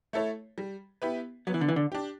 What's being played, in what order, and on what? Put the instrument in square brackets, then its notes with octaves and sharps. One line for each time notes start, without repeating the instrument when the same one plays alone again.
[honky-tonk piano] A3 E4 A4 C#5
G3
B3 E4 G4 B4
[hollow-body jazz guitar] F#3 [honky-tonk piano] B3
[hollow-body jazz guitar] E3
D3
E3
D3
[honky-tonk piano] D4 G4